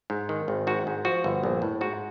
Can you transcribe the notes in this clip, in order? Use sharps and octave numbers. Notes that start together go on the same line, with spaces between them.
G#2
D#3
G#1
G#2 F#4
G#2
F3 F#4
G1
A#1
A2
G#2 F#4